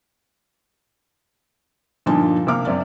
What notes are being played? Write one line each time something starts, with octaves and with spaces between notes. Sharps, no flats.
G2 A#2 D3 F3 D#4 A5
C3 A#3 D6 F6
F#2 C3 D5